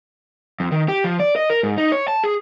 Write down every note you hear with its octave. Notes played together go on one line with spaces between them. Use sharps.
F2
D#3
G4
F3
D5
D#5
A#4
G#2
D#4
C#5
A5
G#4